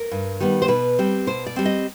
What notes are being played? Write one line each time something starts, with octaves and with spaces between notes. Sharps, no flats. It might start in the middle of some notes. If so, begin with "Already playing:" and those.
Already playing: A#4
G2
D#3 G3 B3
C5
B2 B4
G3 C4
B2 C5
D5
G3 C4
D#5